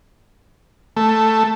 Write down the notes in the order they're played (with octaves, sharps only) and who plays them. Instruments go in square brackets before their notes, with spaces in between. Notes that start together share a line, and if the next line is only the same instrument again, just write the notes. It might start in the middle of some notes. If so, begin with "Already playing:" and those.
[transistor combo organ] A3